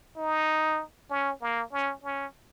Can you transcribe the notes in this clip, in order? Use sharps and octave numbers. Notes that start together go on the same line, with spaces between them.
D#4
C#4
A#3
C#4
C#4